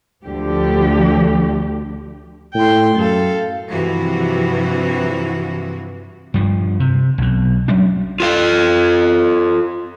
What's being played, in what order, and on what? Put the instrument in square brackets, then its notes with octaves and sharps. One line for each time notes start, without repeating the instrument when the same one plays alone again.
[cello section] D2 D3 F3 G4
[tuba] A2 [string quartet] G5 C6
[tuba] F#2 [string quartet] A4 F5
[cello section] G2 C3 E3 F3 F#4
[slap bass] G2 F3
C3
B1 B2
F#3 G3 C#4 D4
[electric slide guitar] F4 A4 F5